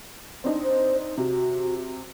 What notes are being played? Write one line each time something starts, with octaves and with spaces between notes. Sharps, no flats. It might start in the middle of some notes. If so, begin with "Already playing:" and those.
C4 D4 D#4
C5
C3 F#4